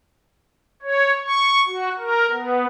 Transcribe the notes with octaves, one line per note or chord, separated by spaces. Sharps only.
C#5
C#6
F#4
A#4
B3